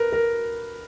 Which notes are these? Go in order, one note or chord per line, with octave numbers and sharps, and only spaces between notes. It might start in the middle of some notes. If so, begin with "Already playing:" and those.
Already playing: A#4 B4
A#4